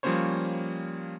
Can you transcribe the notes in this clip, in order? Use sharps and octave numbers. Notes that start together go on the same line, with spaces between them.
F3 G3 A#3 C#4 C5 C#5